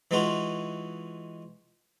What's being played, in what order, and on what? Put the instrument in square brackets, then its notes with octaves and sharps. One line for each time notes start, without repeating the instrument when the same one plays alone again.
[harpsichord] E3 G#3 D#4 F4 F#4